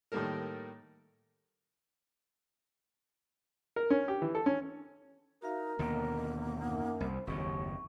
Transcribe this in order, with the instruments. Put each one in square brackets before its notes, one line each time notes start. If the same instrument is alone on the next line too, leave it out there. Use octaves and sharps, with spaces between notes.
[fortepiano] A2 D#3 G3 A#3 A4 A#4
A#4
C#4
G4
E3
A4
C#4
[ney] D#4 [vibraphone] F#4 E5 F5 [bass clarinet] A#4
[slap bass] D#2 B2 D3 [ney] A#3 [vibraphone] D#5
[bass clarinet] F#2 [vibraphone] D#4 F#5
[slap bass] C2 [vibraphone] C5
[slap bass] F#1 A2 D#3 [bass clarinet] D#2 [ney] C4 [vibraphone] C#6